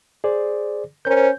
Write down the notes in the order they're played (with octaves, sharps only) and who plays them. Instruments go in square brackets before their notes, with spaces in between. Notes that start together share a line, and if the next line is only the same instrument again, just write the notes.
[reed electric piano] G#4 C5 D5
[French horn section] C#4 A#4 C5 [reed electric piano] G6